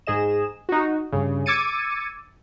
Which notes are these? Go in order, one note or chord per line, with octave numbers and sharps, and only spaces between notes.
G#2 G#4 D#5 E7
D#4 F#4
G2 C#3
D6 E6 G#6 A6 C#7 D#7